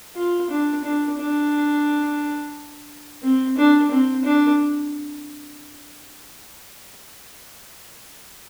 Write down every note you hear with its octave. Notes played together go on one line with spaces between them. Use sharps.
F4
D4
D4
D4
C4
D4
C4
D4